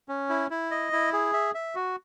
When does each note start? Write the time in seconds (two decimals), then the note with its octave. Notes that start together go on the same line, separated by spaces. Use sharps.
0.09 C#4
0.29 E4
0.50 E4
0.71 D#5
0.93 E4
1.13 G#4
1.33 E5
1.55 E5
1.75 F#4